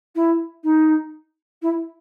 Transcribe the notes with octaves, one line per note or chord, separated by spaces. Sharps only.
E4
D#4
E4